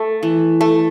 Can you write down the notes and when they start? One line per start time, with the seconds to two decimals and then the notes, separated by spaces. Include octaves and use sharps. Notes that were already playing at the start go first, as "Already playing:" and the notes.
Already playing: A3
0.23 E3
0.61 A3